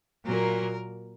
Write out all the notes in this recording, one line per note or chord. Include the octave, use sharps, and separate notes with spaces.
A#2 F#3 A#3 A#4